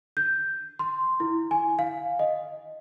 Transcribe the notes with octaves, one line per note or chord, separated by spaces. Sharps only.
G6
C6
E4
G#5
F5
D#5